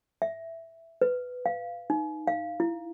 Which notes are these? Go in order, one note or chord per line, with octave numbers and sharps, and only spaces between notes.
E5
B4
F5
D#4
F5
E4